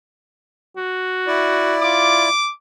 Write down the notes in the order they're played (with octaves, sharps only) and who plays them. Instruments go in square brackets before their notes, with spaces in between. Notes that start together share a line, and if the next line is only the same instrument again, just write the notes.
[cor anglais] F#4
[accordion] E4 D5
[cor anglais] F4 [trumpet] D6